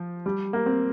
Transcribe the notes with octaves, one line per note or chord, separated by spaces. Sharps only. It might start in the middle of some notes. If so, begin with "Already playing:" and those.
Already playing: F3
G3
A#3
C4